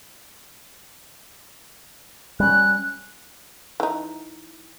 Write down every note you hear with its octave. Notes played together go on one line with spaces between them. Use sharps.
G3 C#4 F#6
E3 D#4